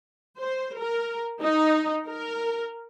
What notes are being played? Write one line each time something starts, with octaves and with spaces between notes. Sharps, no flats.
C5
A#4
D#4
A#4